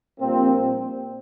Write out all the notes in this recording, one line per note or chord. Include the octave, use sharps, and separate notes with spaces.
A#1 A#2 G3 A#3 C4